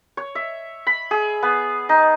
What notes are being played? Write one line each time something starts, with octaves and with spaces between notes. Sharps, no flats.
C#5
E5
B5
G#4
B3
D#4